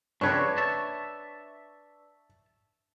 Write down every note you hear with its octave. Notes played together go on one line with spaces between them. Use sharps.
F2 C#3 C4 D4 B4 C#5 C#6 G#6
E5 A5